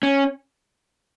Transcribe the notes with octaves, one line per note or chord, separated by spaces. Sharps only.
C#4